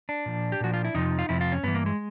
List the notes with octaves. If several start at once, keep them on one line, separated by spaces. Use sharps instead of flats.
D4
A#2 F3
G4
A#2 F3 F#4
F4
E4
F2 C3 F3 D#4
F4
F2 C3 F3 E4
F4
C#4
G2 E3 B3
A#3
G#3